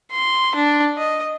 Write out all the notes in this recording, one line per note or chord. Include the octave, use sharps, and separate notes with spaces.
C6
D4
D#5